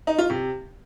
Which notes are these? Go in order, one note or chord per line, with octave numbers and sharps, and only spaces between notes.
D#4
F4
C3